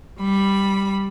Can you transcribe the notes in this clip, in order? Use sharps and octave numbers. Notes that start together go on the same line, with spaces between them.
G3 B5